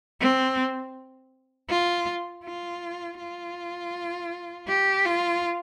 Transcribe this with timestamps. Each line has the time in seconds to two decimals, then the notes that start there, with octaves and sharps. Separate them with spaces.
0.21 C4
1.70 F4
2.45 F4
3.19 F4
4.68 G4
5.05 F4